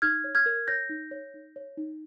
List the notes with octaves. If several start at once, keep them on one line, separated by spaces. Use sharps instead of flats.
D#4 F6 G#6
C#5
F6 G#6
A#4
C#5 G6 A#6
D#4
C#5
D#4
C#5
D#4